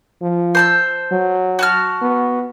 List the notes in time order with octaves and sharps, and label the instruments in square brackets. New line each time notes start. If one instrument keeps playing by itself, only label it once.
[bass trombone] F3
[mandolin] C5 A5 E6
[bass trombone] F#3
[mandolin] F#4 A5 F6
[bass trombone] B3